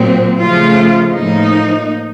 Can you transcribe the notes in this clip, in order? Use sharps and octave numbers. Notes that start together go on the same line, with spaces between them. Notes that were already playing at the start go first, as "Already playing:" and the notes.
Already playing: A#2 F#3 C4
C#3 F3 A3 F4
A2 F3 A#3 D#4